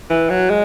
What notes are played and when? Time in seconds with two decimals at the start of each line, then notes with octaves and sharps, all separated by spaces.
0.10 E3
0.29 F#3
0.49 G#3